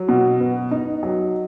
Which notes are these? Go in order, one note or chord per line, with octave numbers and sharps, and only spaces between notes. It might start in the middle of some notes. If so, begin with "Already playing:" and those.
Already playing: F#3
B2
B3
D#4
F#3